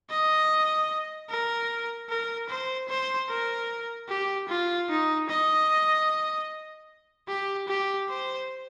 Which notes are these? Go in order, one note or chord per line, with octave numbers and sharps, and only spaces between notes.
D#5
A#4
A#4
C5
C5
A#4
G4
F4
D#4
D#5
G4
G4
C5